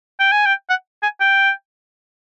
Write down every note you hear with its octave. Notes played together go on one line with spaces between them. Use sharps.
G5
G#5
G5
F#5
G#5
G5